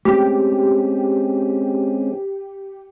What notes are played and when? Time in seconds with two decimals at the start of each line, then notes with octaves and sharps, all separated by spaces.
0.05 G#3 A3 C4 C#4 G4